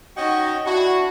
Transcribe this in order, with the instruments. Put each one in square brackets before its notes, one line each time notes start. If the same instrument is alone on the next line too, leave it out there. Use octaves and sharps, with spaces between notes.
[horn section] C#4 D#4 F#4 [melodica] D#5 G5
[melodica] D4 E4 [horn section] F#4